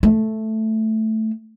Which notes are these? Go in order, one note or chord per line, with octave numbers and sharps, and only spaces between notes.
A3